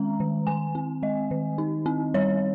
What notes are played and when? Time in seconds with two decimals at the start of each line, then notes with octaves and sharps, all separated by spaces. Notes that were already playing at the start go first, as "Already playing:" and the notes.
Already playing: D#3 G#3 C#4 A#5
0.20 D#3
0.47 D#3 G#5
0.75 C4
1.02 G#3 D#5
1.31 D#3
1.58 D#4
1.86 C4
2.14 G3 C#5